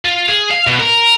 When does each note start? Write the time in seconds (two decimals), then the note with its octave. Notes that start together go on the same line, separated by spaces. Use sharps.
0.05 F4
0.28 G#4
0.51 F5
0.67 B2
0.79 A#4